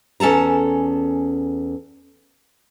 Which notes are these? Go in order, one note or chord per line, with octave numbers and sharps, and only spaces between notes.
E2 C#4 A4 A5 A#5